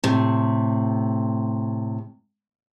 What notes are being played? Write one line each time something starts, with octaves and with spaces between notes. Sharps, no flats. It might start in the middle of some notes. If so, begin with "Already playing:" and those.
A2 C3